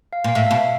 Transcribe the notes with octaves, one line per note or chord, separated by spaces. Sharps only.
F5
A#2 F5
A2 E5
F5
B2
E5